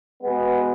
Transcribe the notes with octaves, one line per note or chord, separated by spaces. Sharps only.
B2 G#3 B3